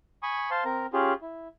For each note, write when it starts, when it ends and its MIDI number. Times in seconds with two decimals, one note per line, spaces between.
0.23 0.50 80
0.23 0.50 83
0.23 0.50 85
0.23 0.50 87
0.51 0.64 72
0.51 0.64 77
0.51 0.64 81
0.51 0.64 84
0.65 0.86 60
0.65 0.86 70
0.65 0.86 82
0.93 1.14 61
0.93 1.14 65
0.93 1.14 67
0.93 1.14 68
1.22 1.48 64